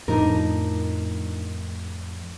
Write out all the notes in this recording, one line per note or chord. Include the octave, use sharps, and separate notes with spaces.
F2 A2 F3 D4 D#4 A#4